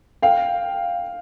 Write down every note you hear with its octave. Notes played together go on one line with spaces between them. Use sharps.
F5 G5